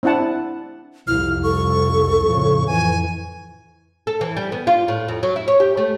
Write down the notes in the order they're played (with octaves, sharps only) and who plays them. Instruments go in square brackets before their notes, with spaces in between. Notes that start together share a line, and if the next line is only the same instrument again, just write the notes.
[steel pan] C4 D4 E4 F#5 A5
[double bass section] C2 F2 [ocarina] E4 [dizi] F6
[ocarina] A4 [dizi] C#6
[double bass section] F2 A2 C#3
[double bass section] F2 E3 [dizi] G#5
[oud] A4
E3
G3
B3
F4
A2
F2
F#3
E4
C#5
G4
A3